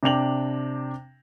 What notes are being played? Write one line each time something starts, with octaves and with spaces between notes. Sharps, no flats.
C3 D4 G5 F7 F#7